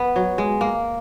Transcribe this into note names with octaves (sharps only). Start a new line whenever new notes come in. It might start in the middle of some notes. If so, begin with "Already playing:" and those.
Already playing: B3
F#3
G#3
A#3